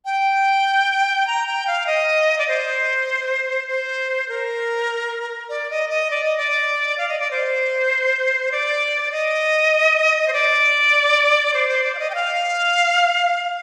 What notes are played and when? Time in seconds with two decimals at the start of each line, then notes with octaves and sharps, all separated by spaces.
0.05 G5
1.27 A#5
1.47 G5
1.67 F5
1.87 D#5
2.38 D5
2.48 C5
3.68 C5
4.29 A#4
5.49 D5
5.70 D#5
5.90 D#5
6.11 D5
6.24 D#5
6.38 D5
6.98 F5
7.09 D#5
7.20 D5
7.31 C5
8.52 D5
9.12 D#5
10.28 C5
10.33 D5
11.54 C5
11.68 C5
11.84 D5
11.95 F5
11.99 D#5
12.10 G5
12.15 F5